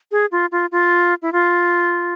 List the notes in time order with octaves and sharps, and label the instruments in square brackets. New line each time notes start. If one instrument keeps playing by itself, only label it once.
[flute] G#4
F4
F4
F4
E4
F4